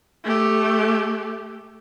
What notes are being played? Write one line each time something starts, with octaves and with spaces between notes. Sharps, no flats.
A3 G4